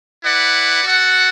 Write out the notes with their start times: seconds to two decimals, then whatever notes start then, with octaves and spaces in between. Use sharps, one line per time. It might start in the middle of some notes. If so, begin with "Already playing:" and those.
0.22 E4 B4 D5 F#5
0.84 F#4 A4 F#5